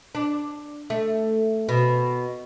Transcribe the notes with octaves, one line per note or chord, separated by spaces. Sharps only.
D4
A3
B2